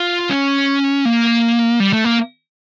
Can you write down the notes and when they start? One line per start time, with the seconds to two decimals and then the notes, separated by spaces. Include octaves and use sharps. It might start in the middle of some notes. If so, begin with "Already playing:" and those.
Already playing: F4
0.30 C#4
1.05 A#3
1.80 G3
1.93 A3
2.04 A#3